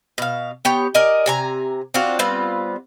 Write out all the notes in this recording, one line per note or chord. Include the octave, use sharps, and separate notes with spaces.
B2 F5
B3 G4 C#5
A#4 D5 D#5 G#5
C3 G#5 A#5
C4 D4 F4 F#4
G3 B3 C4 F4